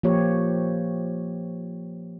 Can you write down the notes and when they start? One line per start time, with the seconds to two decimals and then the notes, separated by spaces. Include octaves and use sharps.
0.03 F3 A#3 G4 C#5